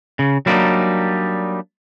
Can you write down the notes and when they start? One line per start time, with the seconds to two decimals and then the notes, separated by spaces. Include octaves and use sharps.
0.19 C#3
0.46 F#3 G3 A#3 D4 D#4